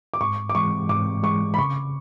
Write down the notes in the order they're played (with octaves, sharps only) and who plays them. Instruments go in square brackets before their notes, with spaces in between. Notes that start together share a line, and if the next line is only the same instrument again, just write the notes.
[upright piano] D6
[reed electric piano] G#2 [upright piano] C#6
[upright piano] D6
[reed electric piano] E3 G#3 [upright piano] C#6
[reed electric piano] G#2 [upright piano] D6
[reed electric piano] E3 G#3 [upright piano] C#6
[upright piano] B5
[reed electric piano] C#3 [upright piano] C#6